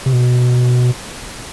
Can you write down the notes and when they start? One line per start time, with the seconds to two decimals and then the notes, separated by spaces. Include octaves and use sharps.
0.06 C3
0.13 B2